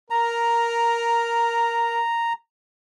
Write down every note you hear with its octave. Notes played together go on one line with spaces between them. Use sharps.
A#4 A#5